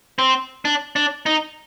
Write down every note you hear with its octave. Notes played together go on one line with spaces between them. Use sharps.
C4
D4
D4
D#4